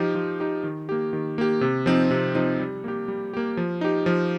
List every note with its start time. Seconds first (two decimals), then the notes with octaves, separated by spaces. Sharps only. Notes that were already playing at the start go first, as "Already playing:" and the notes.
Already playing: F3 D#4 G4
0.15 F3
0.40 D#4 G4
0.64 D#3
0.89 A#3 G4
1.13 D#3
1.38 A#3 G4
1.61 C3
1.86 F3 C4 D#4
2.11 C3
2.35 F3 C4 D#4
2.59 G3
2.84 A#3 G4
3.08 G3
3.33 A#3 G4
3.57 F3
3.81 D#4 G4
4.06 F3